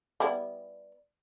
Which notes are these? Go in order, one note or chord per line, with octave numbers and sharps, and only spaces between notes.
G3 B3 E4